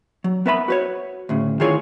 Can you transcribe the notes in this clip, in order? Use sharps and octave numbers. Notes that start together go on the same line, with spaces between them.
F#3
B3 A#4 B4 E5 A5 B5
F#4 B4 C#5
D2 A2 C#3
D#3 E4 F4 G#4 C#5